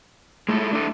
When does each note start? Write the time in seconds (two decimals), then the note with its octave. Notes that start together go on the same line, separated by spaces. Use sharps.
0.49 G#3 A3 E4 A4
0.73 D4 E4 A4